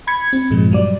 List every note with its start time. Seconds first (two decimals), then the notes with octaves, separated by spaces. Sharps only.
0.07 B5 G#6 C#7
0.33 C4
0.50 G2 A#2 F3 G#3
0.71 F#3 G3 D5